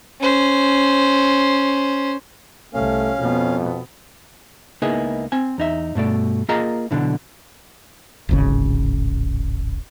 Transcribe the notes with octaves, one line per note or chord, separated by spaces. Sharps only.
C#4 C5
C2 A3 C#4 F5
F2 B2 B3
C#2 A#3 B3 D#4 E4 G#4
C4 G#5
E2 D#4 E5
G2 B2 A3 D5
A#3 F4 G#4 A#4 D#5 A#5
B1 E2 B2 D3 E3
D1 G#1 C#3